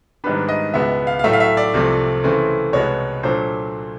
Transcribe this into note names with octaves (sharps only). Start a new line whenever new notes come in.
G#2 D#3 G3 B3 D4 B4
D#5
C#2 B2 G#3 B3 E5
F5
F5
A2 F#3 A3 E5
F5
E5
D5
C2 C3 F3 A3
C#3 E3 A3 C4
C2 B2 G#3 B3 C#5
A#2 F#3 A3 D4 C5